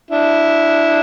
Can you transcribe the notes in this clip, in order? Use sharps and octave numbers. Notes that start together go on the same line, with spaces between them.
D4 E4